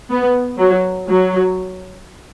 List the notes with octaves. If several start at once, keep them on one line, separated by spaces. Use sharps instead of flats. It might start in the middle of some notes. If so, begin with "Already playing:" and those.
B3
F#3
F#3